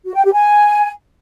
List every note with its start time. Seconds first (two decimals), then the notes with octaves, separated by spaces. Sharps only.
0.05 F#4
0.15 G5
0.24 G4
0.33 G#5